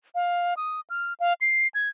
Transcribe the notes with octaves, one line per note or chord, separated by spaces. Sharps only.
F5
D#6
F6
F5
C7
G#6